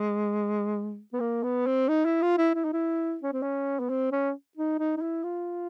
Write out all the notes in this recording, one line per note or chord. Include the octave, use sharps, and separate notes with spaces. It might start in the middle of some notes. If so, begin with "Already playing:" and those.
Already playing: G#3
B3
A#3
B3
C4
D#4
E4
F4
E4
E4
D#4
E4
C#4
C4
C#4
B3
C4
C#4
D#4
D#4
D#4
E4
F4